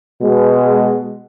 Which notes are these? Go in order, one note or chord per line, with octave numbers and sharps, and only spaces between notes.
B2 G#3